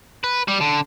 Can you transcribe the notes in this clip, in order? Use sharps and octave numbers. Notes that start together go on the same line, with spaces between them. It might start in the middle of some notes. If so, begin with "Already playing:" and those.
B4
G3
D3